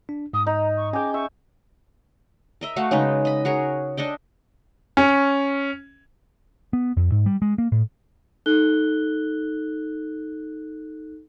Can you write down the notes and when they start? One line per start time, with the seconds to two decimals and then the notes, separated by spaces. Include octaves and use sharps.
0.09 D4
0.33 G#2 D#6
0.47 D#4 A#5
0.77 C#6
0.93 C#4 G#4 G5 G#5 D6
1.14 E5 C#6
2.61 A#4 D#5 E5
2.76 A3 F#4 F5
2.91 C#3 G#3 D#4 B4
3.25 D#5 B5
3.45 F#4 G#4 A#4 C#5
3.97 D4 A4 D#5 G5
4.97 C#4
6.73 B3
6.97 F2
7.12 G#2
7.26 G3
7.42 G#3
7.58 A#3
7.72 A2
8.46 D#4 A4 F#6 G7